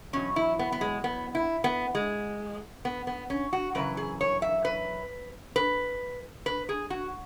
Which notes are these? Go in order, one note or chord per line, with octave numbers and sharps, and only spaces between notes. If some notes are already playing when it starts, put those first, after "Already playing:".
E2 B2 F#3 C#4
E4
B3
B3
G#3
B3
E4
B3
G#3
B3
B3
C#4
F#4
F#2 C#3 E3 B4
G#4
C#5
E5
B4
B4
B4
G#4
F#4